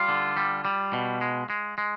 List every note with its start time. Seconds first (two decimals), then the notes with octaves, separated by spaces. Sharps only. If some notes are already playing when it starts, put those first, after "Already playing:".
Already playing: G3 F4
0.09 D3
0.37 G3
0.65 G3
0.93 B2
1.21 G#3
1.50 G#3
1.78 G#3